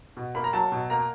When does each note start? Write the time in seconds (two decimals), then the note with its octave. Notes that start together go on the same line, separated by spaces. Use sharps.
0.17 B2
0.35 A#3 B5
0.44 A#5
0.53 F#3 A5
0.72 B2
0.90 A#3 A#5